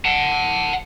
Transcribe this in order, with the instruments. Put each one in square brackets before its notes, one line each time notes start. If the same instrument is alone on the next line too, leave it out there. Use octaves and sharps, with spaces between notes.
[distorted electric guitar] F#5 A5